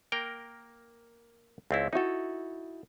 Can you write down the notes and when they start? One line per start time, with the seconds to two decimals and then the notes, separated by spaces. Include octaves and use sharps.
0.12 A#3 A#4 G5
1.71 C#2 C4 E4
1.93 D#4 E4 F#4 A4